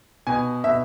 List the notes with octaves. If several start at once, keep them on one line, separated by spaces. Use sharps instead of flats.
B2 G#5
B2 E5